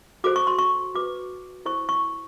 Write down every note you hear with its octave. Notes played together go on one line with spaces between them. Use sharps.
F#4 A4 C5 D6
C#6
C6
C#6
F#4 B4 D6
E4 A4 C5 C#6
C#6